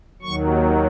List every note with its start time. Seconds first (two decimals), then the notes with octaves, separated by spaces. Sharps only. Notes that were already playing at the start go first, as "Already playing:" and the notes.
0.22 D#2 D#3 F#3 C#6